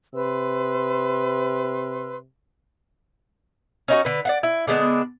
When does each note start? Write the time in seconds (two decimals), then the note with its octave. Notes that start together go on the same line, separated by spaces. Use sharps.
0.14 C3 B4 C6 E6
3.88 C#4 D#4 E4 F#4
4.05 D3 B4
4.25 D5 F5 F#5
4.43 E4
4.67 D3 G#3 B3 D4